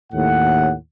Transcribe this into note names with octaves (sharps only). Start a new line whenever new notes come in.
D#2 A2 F#5